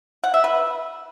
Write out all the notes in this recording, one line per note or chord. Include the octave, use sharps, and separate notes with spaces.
F#5
E5
B4